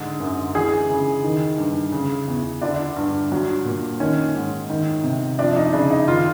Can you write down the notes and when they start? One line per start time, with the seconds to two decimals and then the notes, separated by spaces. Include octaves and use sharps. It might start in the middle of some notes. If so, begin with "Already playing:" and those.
Already playing: G#2 D3
0.20 F#2
0.54 E3 G#4
0.89 C#3
1.24 D#3
1.58 G2
1.92 C#3
2.27 E2
2.62 D3 D4
2.96 G2
3.32 F#3
3.65 A#2
4.00 D#3 C#4
4.35 G#2
4.70 D#3
5.04 C3
5.39 F3 D4
5.56 D#4
5.73 C#3 D4
5.91 D#4
6.08 D#3 F4